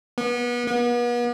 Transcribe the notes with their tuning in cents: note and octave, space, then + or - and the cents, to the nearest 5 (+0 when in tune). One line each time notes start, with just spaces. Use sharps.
B3 -30
B3 -40